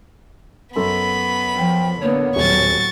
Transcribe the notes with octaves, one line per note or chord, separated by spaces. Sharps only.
F#2 B3 A4 B5 C6
F3 G5
D3 A#3 B3 C#5
D#1 A2 F#3 C#6 A6